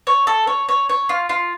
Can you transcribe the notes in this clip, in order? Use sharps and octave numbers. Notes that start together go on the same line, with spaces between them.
C#5
A4
C#5
C#5
C#5
F4
F4